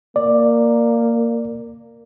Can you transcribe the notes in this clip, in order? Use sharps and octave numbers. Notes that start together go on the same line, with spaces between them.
A#3 D5